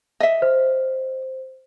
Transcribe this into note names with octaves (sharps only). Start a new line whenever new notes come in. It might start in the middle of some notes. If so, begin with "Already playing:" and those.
D#5 E5
C5